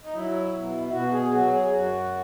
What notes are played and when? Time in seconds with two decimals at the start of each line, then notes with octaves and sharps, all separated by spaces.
0.03 D#4
0.14 F#3 E4
0.54 B2
0.83 E4
0.92 B2 F#4
1.12 G#4
1.31 F#3 F#4
1.51 G#4
1.70 F#2 F#4